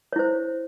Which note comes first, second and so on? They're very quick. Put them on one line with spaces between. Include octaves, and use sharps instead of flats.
C#5 E4 C5